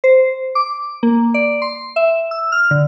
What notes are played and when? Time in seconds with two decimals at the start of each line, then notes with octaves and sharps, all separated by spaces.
0.04 C5
0.55 D6
1.03 A#3
1.34 D5
1.62 C6
1.96 E5
2.31 E6
2.52 F6
2.71 D3